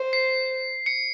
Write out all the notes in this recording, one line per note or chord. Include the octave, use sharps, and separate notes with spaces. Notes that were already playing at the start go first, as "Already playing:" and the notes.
Already playing: C5
C7
C#7